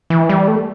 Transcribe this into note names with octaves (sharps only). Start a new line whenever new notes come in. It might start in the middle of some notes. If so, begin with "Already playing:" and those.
E3
G3
A3